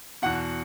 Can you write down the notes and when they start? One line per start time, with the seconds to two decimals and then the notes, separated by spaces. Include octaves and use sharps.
0.22 E2 B2 F#5